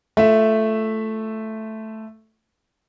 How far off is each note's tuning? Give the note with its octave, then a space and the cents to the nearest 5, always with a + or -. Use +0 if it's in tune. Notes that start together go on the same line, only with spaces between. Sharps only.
A3 +0 F4 -20 E5 +0